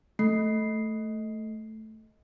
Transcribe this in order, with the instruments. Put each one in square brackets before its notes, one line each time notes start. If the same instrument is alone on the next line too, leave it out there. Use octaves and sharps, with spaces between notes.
[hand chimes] A3 C7